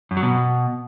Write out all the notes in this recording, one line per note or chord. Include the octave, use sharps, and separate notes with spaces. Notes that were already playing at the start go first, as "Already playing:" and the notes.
F#2
F#3
B2